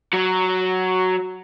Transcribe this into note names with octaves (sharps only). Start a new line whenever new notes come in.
F#3